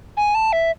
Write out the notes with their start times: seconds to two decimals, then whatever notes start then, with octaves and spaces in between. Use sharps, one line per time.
0.17 G#5
0.35 A5
0.52 E5